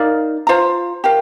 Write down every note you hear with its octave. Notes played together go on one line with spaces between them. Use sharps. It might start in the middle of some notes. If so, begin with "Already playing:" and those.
Already playing: D#4 A#4 D5 F5
F4 C5 F5 A#5
G4 A#4 F5